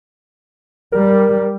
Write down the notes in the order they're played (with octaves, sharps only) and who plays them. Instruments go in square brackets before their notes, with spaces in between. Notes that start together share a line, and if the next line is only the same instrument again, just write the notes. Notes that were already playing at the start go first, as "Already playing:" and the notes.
[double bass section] G3 [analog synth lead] A#4